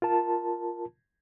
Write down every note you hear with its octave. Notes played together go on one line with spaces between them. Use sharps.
F4 A#4 A5